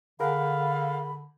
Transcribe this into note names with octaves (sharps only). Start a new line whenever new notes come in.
D3 G#4 A#4 F5 F#5 B5